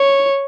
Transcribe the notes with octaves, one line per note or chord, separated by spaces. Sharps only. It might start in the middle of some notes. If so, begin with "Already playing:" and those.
Already playing: C#5